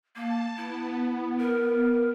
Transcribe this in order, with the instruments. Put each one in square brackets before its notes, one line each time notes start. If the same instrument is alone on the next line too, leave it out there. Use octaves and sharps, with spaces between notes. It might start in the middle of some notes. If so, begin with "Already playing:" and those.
[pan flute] A#3 [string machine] A5
[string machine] B3 [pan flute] E4
[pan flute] A#4